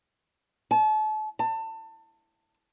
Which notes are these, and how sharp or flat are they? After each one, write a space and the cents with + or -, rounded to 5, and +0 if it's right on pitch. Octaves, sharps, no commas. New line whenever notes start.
A5 -35
A5 +25